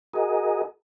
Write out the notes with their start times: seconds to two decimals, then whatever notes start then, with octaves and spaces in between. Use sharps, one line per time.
0.14 F#4 G#4 A#4 D#5